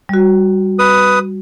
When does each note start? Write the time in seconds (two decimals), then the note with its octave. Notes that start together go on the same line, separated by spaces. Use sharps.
0.09 G3 F#4
0.79 B4 D#6